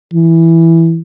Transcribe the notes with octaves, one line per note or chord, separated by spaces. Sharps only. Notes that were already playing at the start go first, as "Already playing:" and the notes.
E3